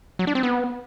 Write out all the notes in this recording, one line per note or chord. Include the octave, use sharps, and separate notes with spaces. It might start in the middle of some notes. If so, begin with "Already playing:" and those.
F#3
D4
C4
B3